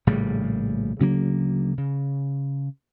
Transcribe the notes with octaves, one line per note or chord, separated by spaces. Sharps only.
A#1 A2 C#3 G3
D2 C#3 F#3 A#3
C#3